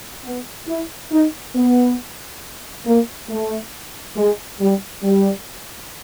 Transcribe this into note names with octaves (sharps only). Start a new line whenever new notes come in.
B3
E4
D#4
B3
A#3
A3
G#3
G3
G3